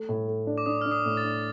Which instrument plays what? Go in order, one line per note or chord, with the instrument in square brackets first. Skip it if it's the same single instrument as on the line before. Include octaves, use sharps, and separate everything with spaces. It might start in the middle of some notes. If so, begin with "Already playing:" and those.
Already playing: [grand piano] A3
A2
A3
D4
[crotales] D6
[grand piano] D4 [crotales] D#6
[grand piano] D4 [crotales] F6
[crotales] D#6
[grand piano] A2
[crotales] A6
[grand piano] D4